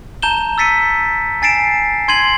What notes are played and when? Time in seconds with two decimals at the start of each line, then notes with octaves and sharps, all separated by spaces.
0.22 A5 A#5 G6 E7 G7
0.58 E6 A6 B6 C#7 D#7
1.42 G#5 A6 C7 D7 E7
2.08 C6 G#6 C7 D#7 F#7